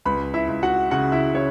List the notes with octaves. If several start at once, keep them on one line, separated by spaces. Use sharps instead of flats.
C#2 B4 B5
E4 E5
C#2
F#4 F#5
C#3 F#4 F#5
E4 E5
C#3 C#5